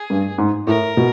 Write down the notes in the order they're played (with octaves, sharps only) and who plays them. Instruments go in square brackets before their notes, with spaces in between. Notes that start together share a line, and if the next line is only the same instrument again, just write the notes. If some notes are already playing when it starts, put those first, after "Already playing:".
Already playing: [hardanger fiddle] G#4
[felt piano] G2
G#2
[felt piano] A2 [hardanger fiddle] A#4
[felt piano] B2